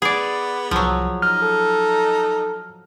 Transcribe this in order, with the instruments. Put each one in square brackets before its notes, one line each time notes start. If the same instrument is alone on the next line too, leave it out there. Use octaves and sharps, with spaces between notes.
[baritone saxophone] B3 [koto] G#4 D5
[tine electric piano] C2 [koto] F3 F#3
[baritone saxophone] D#4 [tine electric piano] F6
[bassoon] A4